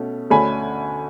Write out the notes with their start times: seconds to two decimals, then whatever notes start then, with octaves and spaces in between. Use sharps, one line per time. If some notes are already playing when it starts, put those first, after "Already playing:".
Already playing: B2 A3 C#4
0.30 D2 D3 A3 C#4 G#5 B5